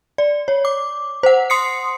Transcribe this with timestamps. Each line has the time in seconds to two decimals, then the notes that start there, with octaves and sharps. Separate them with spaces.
0.18 D5
0.48 C#5
0.65 D6
1.23 C5 F#5
1.50 C6 D#6 C7 C#7